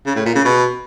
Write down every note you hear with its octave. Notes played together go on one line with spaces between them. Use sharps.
C#3
A2
A#2
C#3
B2